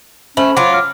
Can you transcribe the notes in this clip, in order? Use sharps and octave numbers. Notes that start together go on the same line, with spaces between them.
A3 C#4 C5 B5 F#7
F#3 F4 D6
F6